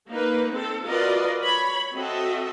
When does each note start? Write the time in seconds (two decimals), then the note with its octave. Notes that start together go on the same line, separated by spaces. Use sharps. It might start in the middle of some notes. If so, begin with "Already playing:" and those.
0.10 A#3 D#4 B4
0.51 C4 A4
0.86 F4 F#4 A#4 B4 D5 D#5
1.42 C#5 B5
1.93 C4 F#4 A4 D#5 E5